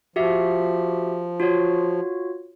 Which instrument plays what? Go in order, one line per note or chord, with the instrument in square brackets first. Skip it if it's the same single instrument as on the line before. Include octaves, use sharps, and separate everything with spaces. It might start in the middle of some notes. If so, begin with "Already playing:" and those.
[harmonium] F3 [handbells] F#4 G4 E5
[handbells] F4 F#4 C#5